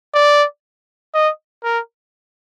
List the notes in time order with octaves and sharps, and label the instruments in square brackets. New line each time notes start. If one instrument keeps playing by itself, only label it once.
[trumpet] D5
D#5
A#4